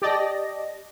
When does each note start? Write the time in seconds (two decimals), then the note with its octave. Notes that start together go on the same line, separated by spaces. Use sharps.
0.02 G4 D5 D#5 A5 A#6